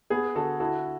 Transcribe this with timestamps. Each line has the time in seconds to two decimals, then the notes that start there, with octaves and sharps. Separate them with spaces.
0.10 B3 G#4
0.35 D3 F#4 A4
0.60 E4 F#4 A4